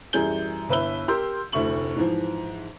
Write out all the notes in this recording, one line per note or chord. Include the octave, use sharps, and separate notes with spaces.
F#2 E3 G3 G#4 G6 G7
G1 E4 B4 E5 E6 G7
G4 A#4 C6 E6 G6
F1 D2 A3 E4 C#6 F#7
G#2 E3 F3